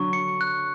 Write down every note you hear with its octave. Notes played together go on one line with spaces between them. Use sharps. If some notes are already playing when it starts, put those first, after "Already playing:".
Already playing: D3 F#3 C#6
C#7
F#6